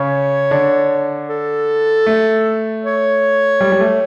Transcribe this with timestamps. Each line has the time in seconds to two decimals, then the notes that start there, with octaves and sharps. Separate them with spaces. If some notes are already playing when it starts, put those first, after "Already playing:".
Already playing: C#3 C#4 C#5
0.51 D3 D4
1.28 A4
2.06 A3
2.83 C#5
3.61 G3
3.72 G3
3.80 A3